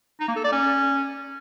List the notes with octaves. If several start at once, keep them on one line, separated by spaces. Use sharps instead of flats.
D#4
A#3
A4
D5
C#4